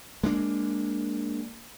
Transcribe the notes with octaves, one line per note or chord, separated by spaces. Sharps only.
G#3 A#3 D4